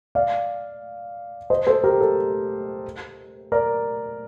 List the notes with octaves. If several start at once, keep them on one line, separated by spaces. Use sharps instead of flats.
D5 F5
C5 D#5
A4 C5
G4 A#4
A4
A#4 D5